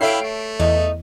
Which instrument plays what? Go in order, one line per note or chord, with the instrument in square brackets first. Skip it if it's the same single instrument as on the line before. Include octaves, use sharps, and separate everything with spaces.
[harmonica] E4 F5 G5 [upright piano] A4 C#5 E5 [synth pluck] C7 D7
[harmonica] A3
[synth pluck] E2 [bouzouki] D#4